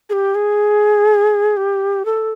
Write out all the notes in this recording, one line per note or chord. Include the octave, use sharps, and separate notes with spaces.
G#4
G4
G#4
G4
A4